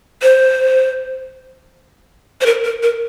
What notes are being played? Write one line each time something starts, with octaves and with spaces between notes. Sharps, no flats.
C5
C5
A#4
A#4
A#4